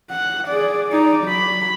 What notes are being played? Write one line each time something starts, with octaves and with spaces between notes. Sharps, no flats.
F#5
G#4 D5
D#4 D5
F#3 B5